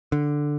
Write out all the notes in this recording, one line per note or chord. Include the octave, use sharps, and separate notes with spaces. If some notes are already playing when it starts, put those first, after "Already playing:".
D3